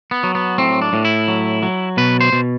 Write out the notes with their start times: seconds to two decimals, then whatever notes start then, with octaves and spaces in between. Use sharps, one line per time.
0.11 B3
0.23 F#3
0.35 B3
0.58 A2 C4
0.82 D4
0.93 A2
1.05 E4
1.28 F#3
1.62 F#3
1.97 B2 B4
2.21 C5
2.33 B2